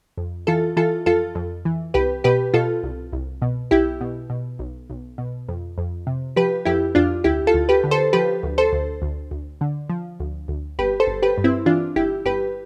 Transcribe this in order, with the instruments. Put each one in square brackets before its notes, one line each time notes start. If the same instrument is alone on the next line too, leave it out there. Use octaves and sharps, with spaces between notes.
[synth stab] F2
E3 F4 A4
E3 F4 A4
F2 F4 A4
F2
E3
C2 G4 B4
B2 G4 B4
B2 F4 A4
C2
C2
B2
B1 E4 G4
B2
B2
B1
B1
B2
F2
F2
C3
F3 G4 B4
F2 E4 G4
F2 D4 F4
D2 E4 G4
F4 A4
D2
G4 B4
D3
A4 C5
F3 G4 B4
D2
A4 C5
D2
D2
D2
D3
F3
D2
D2
G1 G4 B4
A4 C5
G1
G4 B4
G2
C4 E4
E3 D4 F4
G1 E4 G4
G1 G4 B4